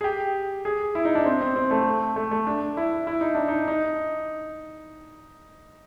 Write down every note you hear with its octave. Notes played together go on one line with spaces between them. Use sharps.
G#4
G4
G#4
E4
D#4
D4
C4
C4
C4
A3
A3
A3
D4
E4
E4
D#4
D4
D#4
D#4